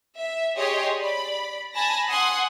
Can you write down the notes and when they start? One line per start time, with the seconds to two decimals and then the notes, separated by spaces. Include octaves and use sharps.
0.17 E5
0.57 G4 G#4 C#5 D#5 C6
0.97 D5 B5
1.74 G#5 A5 B5 A#6
2.09 F#5 G#5 C6 D#6